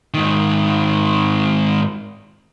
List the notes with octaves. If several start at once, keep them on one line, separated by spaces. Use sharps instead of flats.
G#2 D#3